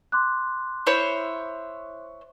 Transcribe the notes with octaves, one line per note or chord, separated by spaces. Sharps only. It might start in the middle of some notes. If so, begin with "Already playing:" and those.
C6 D6 F#6
E4 C5 C#5